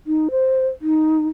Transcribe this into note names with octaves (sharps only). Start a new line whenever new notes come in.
D#4
C5
D#4